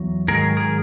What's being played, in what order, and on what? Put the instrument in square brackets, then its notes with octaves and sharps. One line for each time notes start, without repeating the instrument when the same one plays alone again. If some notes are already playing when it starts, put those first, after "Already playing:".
Already playing: [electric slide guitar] E2 F#3
G#2 D#3 F#3 G#4 A#4
G#4 A#4